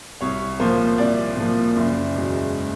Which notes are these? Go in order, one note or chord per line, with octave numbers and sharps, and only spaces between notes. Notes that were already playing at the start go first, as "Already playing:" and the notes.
C2 C#5
A#2 F3 A#3 C5
C2 D5
A#2 F3 A#3
F#1
E2 B2 G#3